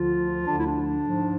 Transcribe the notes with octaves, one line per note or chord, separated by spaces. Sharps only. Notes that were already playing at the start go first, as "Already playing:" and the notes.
Already playing: D2 D3 F3 F4
D2 D3 F3 D4
E4
D4
G#2 F3